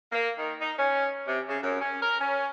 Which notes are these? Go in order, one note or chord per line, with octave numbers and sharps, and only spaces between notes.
A#3
D#3
D#4
C#4
C3
C#3
F#2
C#4
A#4
C#4